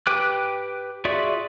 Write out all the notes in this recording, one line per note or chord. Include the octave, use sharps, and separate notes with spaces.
G4 B4 G5 D6 F#6
F4 F#4 G#4 D5 E5